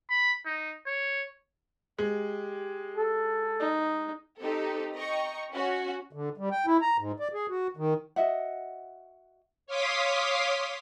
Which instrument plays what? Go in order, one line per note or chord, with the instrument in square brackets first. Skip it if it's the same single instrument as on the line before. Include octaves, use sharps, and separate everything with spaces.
[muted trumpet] B5
D#4
C#5
[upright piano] G#3 [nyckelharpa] G4
[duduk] A4
[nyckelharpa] D#4
[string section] C4 D#4 G4 A4
D#5 G5 A#5 C#6
C#4 F#4
[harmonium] D3
G3
G5
E4
A#5
G#2
D5
G#4
F#4
D#3
[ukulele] F#4 D#5 E5 F#5
[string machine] C#5 F5 C6 D6 D#6 B6